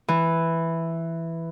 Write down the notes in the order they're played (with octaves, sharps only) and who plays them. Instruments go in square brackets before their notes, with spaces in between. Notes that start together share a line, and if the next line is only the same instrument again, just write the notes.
[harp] E3